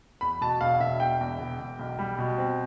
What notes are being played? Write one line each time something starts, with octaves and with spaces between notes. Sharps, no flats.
E2 B5
B2 A5
E1 F5
B2 E5
E1 G5
E2
E1
E1
B1
G3
B2
C4